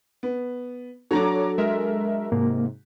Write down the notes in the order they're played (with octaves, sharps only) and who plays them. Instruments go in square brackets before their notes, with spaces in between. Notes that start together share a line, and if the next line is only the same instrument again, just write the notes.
[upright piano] B3
[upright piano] F#3 D4 F#4 [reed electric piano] A4 [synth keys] C#5 A#5 D6
[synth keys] G#3 A#4 E5
[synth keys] G#2 C3 [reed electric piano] A#3